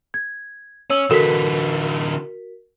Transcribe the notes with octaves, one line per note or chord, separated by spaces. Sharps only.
G#6
C#4 C#5 E6 F#7
D3 E3 F#4 A4 A#4 B6